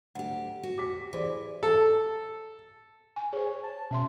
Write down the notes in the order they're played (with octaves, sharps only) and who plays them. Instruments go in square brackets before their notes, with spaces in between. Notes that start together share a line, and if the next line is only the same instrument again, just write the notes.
[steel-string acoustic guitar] D2 G4 [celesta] F#5
[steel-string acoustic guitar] F#4
[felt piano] G4 B6 [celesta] D6
[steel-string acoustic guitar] E3 [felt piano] G#4 C5 D5
[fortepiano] A4
[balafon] G#5
[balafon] G#4 C5 [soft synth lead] C#5
[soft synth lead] A5
[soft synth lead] B2 [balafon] C#4 E5 C6